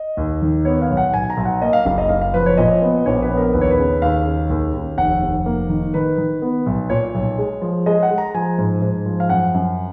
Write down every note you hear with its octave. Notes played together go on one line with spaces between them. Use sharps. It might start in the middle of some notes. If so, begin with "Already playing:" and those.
Already playing: D#5
D#2
D#3
B3 C#5
F5
B1
F#5
B1 G#5
A#5
B1
F#5
A#3 D#5
F5
F#1 F5
D#5
F#1 F5
F5
F3 B4
C#5
A#2 D#5
B3
A#1 C#5
B4
B3
A#4
D#2 B4
C#5
B4
C#3
D#2 F5
C#3
D#2
D#2
F1 F#5
F1
A#3
D#3
D#3 B4
D#3
B3
B1
A#2 C#5
B1
G#3
F3
G#3 D#5
F#5
G#3
A#5
F3 G#5
G#2
G#2
F3
F5
F#2 F#5
F#2